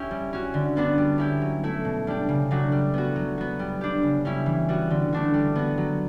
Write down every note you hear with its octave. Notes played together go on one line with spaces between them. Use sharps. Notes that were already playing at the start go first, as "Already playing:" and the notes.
Already playing: C#4 E4 G4
G3
C#4 F#4
D3
G3 B3 D4 F#4
G3
C#4 E4 G4
F#3
A3 E4
B2
G3 D4 G4
C#3
F#3 A3 D4 F#4
G3
B3 F#4
F#3
B3 F#4
G3
D4 G4
C#3
G3 C#4 E4
E3
G3 B3 F#4
D3
A3 D4 F#4
G3
B3 F#4
F#3